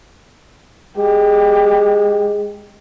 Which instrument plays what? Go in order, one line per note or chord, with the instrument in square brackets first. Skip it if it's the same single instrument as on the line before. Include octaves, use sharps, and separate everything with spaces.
[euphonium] G#3 [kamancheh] G4